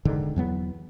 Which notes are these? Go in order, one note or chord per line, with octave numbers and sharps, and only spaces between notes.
E1 G#2 D3 D#3
E2 F#3 B3